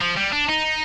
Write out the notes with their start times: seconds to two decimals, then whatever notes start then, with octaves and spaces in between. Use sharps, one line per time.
0.01 F3
0.17 G3
0.33 D4
0.49 D#4